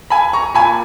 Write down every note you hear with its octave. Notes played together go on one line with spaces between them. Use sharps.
G#5 B5
A#5 C#6
A#2 G#5 B5